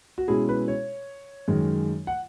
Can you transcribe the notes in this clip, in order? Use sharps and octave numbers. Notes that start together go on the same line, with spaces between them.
F#4
B2 G#3 C#4 E4 G#4
B4
C#5
F#2 D#3 G#3
F#5